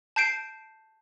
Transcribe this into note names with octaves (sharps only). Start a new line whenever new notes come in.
A5 G6 C7 D7